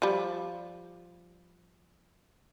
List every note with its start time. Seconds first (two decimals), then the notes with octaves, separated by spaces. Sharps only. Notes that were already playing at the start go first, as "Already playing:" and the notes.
0.02 F3 G3